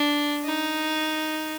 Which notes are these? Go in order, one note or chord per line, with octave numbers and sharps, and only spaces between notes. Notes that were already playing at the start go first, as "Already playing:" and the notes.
Already playing: D4
D#4